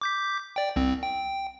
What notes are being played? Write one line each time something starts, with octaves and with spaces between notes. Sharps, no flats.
D6 G6 B6
D5 G5
C2 C4
G5